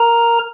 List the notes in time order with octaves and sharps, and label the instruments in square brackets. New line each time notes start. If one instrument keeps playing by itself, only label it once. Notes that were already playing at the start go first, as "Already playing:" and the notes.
Already playing: [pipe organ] A#4 A#5